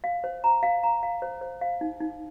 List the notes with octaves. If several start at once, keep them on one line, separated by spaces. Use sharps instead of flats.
F5
C5
A#5
F5
A#5
F5
C5
C5
F5
D#4
D#4